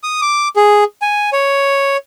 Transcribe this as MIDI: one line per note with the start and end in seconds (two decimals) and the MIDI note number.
0.03 0.21 87
0.22 0.48 86
0.56 0.84 68
1.02 1.30 80
1.33 1.97 73